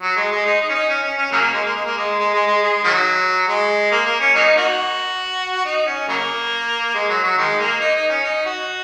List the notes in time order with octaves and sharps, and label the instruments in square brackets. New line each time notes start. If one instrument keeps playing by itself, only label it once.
[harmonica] F#3
G#3
G#3
D#4
D#4
C#4
D#4
C#4
C#4
C#4
C#3 F#3 A#3
G#3
A#3
G#3
A#3
G#3
G#3
G#3
G#3
G#3
D#3 F#3
G#3
A#3
A#3
C#4
F#3 A#3 D#4
A#3 D#4 F#4
D#4
C#4
C#3 F#3 A#3
G#3
F#3
F#3
D#3 G#3
A#3
D#4
D#4
C#4
D#4
F#4